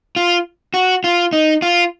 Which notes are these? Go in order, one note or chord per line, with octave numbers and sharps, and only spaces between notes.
F4
F#4
F4
D#4
F4